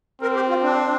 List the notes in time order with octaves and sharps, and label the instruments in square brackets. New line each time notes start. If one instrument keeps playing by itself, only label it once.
[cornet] C4 [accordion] A#4
[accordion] G4
F4
D4